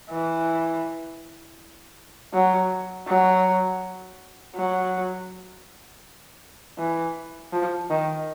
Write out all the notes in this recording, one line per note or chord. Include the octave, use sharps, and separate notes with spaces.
E3
F#3
F#3
F#3
E3
F3
D#3